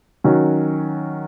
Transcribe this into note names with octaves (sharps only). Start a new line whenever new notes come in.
D#3 F#3 C#4 F#4